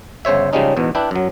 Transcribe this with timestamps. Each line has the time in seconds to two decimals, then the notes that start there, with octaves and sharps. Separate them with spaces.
0.25 G1 C#3 C5 C#5 E5
0.53 C#3 F3 G3 G#3 C#4 D#4
0.77 E2 G#2 B2
0.95 D4 E4 B4 G5
1.11 F#2 F#3